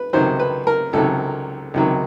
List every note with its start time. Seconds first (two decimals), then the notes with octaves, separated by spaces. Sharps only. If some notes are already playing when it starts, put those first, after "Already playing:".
Already playing: B4
0.13 C#2 C3 D#3 F#3 C5
0.39 B4
0.67 A#4
0.93 C#2 C3 D#3 F#3 A4
1.74 C#2 C3 D#3 F#3